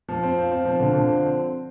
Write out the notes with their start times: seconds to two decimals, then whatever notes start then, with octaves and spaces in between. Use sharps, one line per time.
0.08 F3
0.23 C4
0.37 F4
0.51 C4
0.65 F3
0.80 D3
0.94 D3
1.08 C4